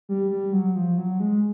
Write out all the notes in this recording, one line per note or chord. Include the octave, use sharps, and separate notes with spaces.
G3
G3
F#3
F3
F#3
G#3